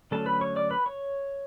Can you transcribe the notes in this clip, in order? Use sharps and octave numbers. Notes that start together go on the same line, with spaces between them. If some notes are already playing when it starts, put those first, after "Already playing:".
D3 F#3 A3 C#4 A4 A5
B4 B5
C#5 C#6
D5 D6
B4 B5
C#5 C#6